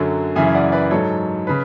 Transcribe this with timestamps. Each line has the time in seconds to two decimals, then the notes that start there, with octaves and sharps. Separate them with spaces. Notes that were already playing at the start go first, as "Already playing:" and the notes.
Already playing: F#2 D3 F#3
0.36 F#2 C#3 E3 E5 G#5
0.55 D5 F#5
0.72 B4 D5
0.91 G#2 F#3 A4 C#5
1.47 C#3 B4